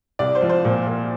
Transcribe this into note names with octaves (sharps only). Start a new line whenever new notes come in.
C2 D5
C5
F3
C5
A#2
A#2